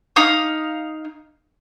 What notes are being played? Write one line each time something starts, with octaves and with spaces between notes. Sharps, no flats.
D#4 F5 D#6